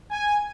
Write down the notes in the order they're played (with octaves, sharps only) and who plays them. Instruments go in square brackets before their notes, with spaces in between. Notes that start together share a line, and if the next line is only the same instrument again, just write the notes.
[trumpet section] G#5